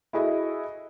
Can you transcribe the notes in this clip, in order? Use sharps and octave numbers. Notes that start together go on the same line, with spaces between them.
E4 F#4 G#4 A4 D#5 E5